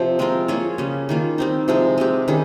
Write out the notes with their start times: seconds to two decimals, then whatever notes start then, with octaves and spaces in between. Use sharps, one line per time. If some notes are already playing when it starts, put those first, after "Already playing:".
Already playing: C3 F3
0.19 G#3 C4 F4 A#4
0.48 A#3 F4 G#4 C#5
0.78 C#3 G3 C#4
1.09 D#3 A#3 F4
1.38 G3 C4 D#4
1.68 C3 F3 G#3
1.98 G#3 C4 G4
2.28 D#3 G3 C#4 G#4